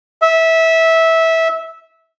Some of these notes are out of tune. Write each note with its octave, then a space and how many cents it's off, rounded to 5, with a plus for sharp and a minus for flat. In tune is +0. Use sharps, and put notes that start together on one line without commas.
E5 -15